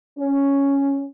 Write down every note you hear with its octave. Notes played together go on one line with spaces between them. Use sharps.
C#4